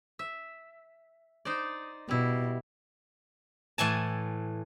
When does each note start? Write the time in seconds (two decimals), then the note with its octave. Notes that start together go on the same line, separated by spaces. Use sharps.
0.19 E5
1.45 D#4 C5 D5
2.09 B2 G3 E4
3.78 A2 E3 G#5 A5